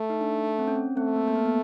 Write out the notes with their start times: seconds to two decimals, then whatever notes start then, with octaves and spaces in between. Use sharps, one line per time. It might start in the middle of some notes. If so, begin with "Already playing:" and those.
Already playing: A3
0.10 D#4
0.21 D4
0.59 C4
0.68 C#4
0.75 C4
0.97 A3 C4
1.16 A#3
1.28 A#3
1.35 B3
1.46 B3